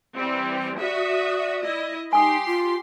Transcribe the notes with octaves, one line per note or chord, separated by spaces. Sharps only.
E3 G3 C4
F#4 D5 E5 D#6
E4 D#5
D#4 G4 G#5 C6 D#6
F4